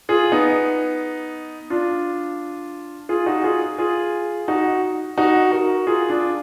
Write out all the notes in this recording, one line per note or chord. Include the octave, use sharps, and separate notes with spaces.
F4 G#4
B3 D#4
D4 F4
F4 G#4
D#4 F#4
F4 G#4
F4 G#4
D#4 F#4
D#4 F#4
F#4 A#4
F4 G#4
D4 F4